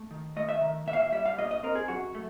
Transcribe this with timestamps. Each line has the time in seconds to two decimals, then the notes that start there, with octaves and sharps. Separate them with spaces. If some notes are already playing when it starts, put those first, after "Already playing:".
Already playing: A3
0.11 D#3
0.36 A3 D#5
0.49 E5
0.61 D#3
0.87 A#2 E5
0.93 F5
1.00 E5
1.12 G3 E5
1.26 F5
1.38 A#2 D#5
1.51 D#5
1.63 C4 A#4
1.75 G#4
1.88 F#2 F#4
2.15 A3